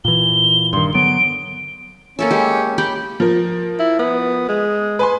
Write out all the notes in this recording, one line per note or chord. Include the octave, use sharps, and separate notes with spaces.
A#2 E3 G7
G2 D#3 C6
D3 F#3 B3 D7
A#3 C#4 A4 E5
G#3 G4
G4 G5 B5
F3 A#4
E4
B3
G#3
B4 G#5 C6